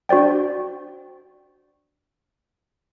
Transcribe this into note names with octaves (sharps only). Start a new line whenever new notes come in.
D4 F#4 C5 D5 G5